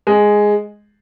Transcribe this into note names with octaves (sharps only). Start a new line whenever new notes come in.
G#3